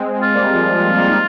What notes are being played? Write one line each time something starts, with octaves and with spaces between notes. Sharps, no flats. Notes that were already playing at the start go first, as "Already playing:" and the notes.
Already playing: G#3 C4
G#3 C4
F4
G3 A#3
F3 G#3
F3 G#3
G3 A#3
D#4